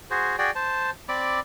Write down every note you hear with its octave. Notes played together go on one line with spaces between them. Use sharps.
F#4 G#4 C5
F#4 G#4 D5 G5
C5 A5
C4 D5 B5 D6